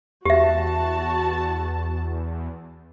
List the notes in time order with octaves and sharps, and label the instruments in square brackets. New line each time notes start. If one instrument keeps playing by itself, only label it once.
[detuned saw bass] E2 [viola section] F#4 A5 [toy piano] G4 E5